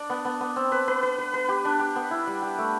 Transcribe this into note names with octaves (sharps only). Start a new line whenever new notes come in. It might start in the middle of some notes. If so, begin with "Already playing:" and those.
Already playing: D4 D5
B3
B3
B3
C4
B4
B4
B4
B4
B4
G4
D4
G4
B3
E4
G3
G4
A3